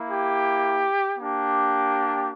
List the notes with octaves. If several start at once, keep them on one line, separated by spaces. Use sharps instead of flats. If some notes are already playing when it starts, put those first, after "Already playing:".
Already playing: A#3 E4
G4
A#3 D4 G4